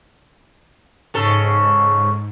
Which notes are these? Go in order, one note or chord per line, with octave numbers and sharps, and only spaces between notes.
G#2 C#3 A4